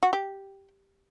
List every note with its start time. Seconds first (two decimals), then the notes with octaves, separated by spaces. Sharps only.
0.03 F#4
0.13 G4